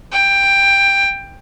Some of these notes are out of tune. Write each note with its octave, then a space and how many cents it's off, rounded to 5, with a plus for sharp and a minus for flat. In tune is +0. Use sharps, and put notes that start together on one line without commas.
G5 +15